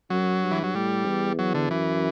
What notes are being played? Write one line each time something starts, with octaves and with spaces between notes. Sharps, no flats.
F#2 F#3
G2
E3
F#3
A2 G3
E2
F#3
D3
F#2 E3